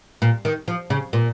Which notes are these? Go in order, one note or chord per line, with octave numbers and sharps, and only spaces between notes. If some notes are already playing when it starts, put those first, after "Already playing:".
A#2
D#3
F3
C#3
A#2